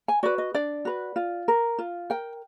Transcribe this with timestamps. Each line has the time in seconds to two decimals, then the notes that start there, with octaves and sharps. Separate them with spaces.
0.08 G#5
0.23 F#4 B4 D5
0.38 D#5
0.54 D4 D5
0.85 F#4 B4
1.16 F4
1.48 A#4
1.78 F4
2.10 A#4 G5